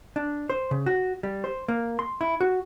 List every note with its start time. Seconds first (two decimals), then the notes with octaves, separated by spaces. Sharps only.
0.16 D4
0.50 C5
0.71 C#3
0.86 F#4
1.23 G3
1.44 C5
1.68 A#3
1.99 C6
2.21 E4
2.41 F#4